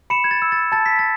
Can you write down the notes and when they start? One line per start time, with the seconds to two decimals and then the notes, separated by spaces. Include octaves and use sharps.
0.10 B5 C#7 E7
0.24 G#6
0.31 A6
0.42 E6
0.52 A6
0.72 A5 A6
0.86 B6
0.99 A6